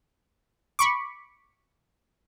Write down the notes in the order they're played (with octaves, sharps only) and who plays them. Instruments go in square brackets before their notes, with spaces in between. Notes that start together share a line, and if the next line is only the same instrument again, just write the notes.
[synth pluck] B5 C#6 D6